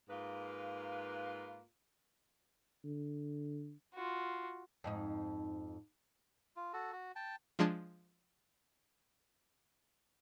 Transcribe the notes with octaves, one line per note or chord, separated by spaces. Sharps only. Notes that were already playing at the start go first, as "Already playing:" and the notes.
G#2 A#3 F4 B4
D3
F4 F#4
F2 G#2 D#4
F4
F#4 A4
F#4
G5 A5
F3 G#3 D4 A5 G#6